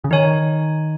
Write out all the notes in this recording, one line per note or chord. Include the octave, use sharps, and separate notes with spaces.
C#3
D#3 D#4 C#5 G#5